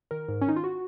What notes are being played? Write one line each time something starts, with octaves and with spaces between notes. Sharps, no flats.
D#3 A#4
G#2
C#4
D#3 D#4
F4
F#4